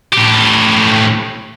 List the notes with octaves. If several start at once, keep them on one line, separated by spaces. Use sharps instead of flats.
A2 G4